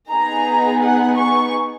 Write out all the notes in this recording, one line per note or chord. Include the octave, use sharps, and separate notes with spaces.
B3 D#4 G#4 A#5
F#5
C#6